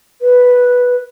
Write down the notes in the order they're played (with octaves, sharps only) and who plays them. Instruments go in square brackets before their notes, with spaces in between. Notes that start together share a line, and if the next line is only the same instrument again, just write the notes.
[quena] B4